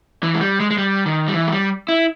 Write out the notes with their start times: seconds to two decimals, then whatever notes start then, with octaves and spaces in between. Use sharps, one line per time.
0.23 E3
0.34 G#3
0.41 G3
0.60 G#3
0.71 G#3
0.78 G3
1.06 D#3
1.28 G3
1.34 E3
1.47 G#3
1.52 G3
1.88 E4